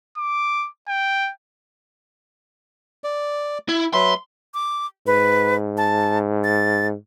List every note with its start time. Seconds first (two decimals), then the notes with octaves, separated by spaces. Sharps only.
0.17 D6
0.89 G5
3.04 D5
3.69 E4
3.94 F#3 B4 E5 C6
4.54 D6
5.07 G#2 B4
5.77 A5
6.44 A6